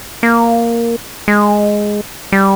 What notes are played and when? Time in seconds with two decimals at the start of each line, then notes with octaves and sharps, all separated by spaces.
0.23 A#3
1.28 G#3
2.32 G3